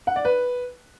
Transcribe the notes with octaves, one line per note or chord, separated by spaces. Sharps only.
F#5
D5
B4